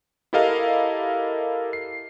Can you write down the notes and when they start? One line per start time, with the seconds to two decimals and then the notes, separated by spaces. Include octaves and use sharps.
0.33 E4 G4 A4 A#4 D#5 F5
1.73 C7